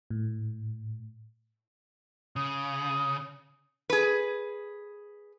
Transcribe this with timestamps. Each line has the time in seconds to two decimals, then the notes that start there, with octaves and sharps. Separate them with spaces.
0.10 A2
2.36 C#3 D#6
3.90 G#4 B4